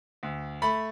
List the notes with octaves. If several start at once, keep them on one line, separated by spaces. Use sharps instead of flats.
D2
A3 B5